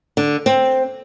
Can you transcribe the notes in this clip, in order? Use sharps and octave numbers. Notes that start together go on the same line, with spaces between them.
D3
C4